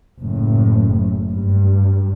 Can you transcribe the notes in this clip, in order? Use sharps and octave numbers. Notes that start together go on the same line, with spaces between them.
F#1 A2
G2